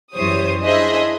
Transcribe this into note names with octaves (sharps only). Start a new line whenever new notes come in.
F#2 E3 G3 C5 C#5 D#6
D4 E4 G#4 C5 D#5 E5